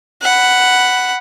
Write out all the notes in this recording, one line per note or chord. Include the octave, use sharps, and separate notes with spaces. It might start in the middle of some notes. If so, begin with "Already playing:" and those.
F#5 B5